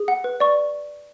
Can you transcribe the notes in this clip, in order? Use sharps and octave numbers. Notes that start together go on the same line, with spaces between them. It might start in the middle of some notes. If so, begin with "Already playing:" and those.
Already playing: G#4
F#5
B4
D5 C#6